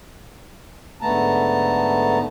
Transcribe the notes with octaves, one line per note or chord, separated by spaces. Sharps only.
G#2 D3 A3 B3 A5 A#5